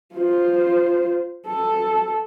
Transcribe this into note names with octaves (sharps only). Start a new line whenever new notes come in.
F4 C5
A4